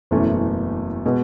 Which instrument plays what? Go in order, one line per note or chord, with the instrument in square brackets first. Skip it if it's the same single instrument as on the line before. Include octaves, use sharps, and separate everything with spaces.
[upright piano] F#1 E2 B2 A3 C#4
B2 G#3 B3